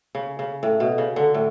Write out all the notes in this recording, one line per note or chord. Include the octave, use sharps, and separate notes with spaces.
C#3
C#3
A2
B2
C#3
D3
A2